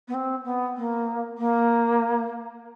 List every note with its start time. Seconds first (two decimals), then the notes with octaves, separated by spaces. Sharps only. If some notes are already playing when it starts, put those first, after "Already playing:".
0.08 B3
0.14 C4
0.45 B3
0.76 A#3
1.38 A#3